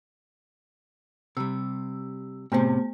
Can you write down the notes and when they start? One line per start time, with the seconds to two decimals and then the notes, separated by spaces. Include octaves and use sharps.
1.37 C3 G3 E6
2.52 A2 C3 A3 B3 C5